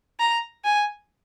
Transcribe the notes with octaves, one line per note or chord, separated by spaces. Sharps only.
A#5
G#5